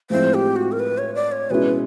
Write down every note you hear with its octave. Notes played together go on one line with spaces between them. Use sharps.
A2 F3 G#3 C4 E4 C5
G4
F#4
A#4
B4
C#5
D5
C#5
B2 G#3 C#4 E4 B4